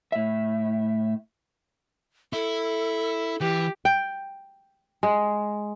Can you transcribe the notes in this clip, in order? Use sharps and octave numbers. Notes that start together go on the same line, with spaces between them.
A2 E5
E4 A4
E3 G4
G5
G#3